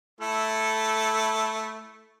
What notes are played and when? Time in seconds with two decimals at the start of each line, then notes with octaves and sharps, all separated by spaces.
0.21 A3 E4 A4